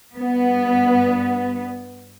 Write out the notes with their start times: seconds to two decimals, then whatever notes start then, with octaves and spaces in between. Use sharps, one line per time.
0.15 G2 B3